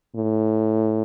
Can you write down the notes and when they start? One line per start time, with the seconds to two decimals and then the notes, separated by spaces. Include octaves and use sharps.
0.16 A2